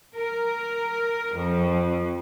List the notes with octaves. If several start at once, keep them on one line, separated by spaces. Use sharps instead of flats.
A#4
F2